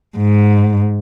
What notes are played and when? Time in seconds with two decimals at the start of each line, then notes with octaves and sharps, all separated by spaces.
0.18 G#2